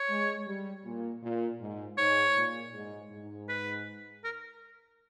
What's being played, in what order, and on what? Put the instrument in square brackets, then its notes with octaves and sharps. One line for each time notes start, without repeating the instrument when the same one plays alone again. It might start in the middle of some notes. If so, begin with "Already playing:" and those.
Already playing: [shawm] C#5
[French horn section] G#3
G3
A#2
A#2
G#2
[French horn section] G#2 [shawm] C#5
[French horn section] A#2
G#2
G#2
[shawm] B4
A#4